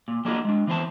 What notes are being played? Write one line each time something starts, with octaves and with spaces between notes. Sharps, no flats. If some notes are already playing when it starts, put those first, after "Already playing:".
A#2
F#3 A#3 D4 D#4 F4 G#4
G#3 D4
E3 B3 C4 C5 A5